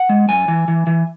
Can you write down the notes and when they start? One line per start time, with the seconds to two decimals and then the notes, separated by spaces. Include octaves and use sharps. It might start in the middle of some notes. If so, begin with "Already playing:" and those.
Already playing: F#5
0.09 G#3
0.29 F#2 G#5
0.48 E3
0.68 E3
0.87 E3